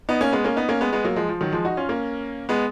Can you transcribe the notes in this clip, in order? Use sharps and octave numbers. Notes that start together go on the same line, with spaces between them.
B3 D#4
A#3 C#4
G#3 B3
A#3 C#4
B3 D#4
A#3 C#4
G#3 B3
G#3 B3
F#3 A#3
F3 G#3
F3
D#3 F#3
F3 G#3
D#4 F#4
C#4 F4
A#3 C#4
G#3 B3